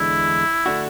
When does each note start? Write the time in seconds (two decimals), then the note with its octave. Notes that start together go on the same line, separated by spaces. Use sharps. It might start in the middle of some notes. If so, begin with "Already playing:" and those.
Already playing: E2 D3 G#3 D4 E4
0.66 D3 A3 D4 F#4